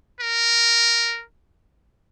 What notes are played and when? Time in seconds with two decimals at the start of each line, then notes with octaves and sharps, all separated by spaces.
0.20 A#4